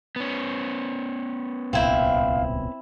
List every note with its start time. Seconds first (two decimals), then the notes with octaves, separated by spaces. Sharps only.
0.16 B3 C#4
1.73 D1 C2 A#2 C4 E4 F5